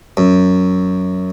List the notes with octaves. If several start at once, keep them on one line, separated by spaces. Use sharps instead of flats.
F#2